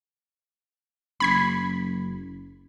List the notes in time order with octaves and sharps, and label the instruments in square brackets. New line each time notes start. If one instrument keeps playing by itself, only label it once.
[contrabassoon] F#1 [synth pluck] B5 G#6 B6